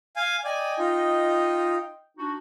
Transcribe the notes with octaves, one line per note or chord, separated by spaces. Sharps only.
F5 G#5
D5 D#5 G5 G#5
D#4 F4
D4 D#4 F#4